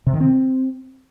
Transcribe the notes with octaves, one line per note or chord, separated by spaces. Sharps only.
C3
D#3
C4